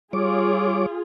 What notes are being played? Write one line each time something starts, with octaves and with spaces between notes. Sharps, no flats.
G3 F4 G#4 C#5 D6